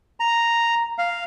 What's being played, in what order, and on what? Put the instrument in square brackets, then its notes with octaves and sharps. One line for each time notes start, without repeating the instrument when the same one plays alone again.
[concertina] A#5
F5